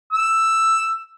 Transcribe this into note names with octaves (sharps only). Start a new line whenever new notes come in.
E6